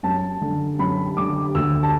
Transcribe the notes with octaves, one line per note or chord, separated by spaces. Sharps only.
F#2 A5
D3
F#2 B5
D3 D6
D2 E6
A5